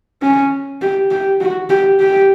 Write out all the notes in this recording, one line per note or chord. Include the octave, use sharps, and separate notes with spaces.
C#4
G4
G4
F#4
G4
G4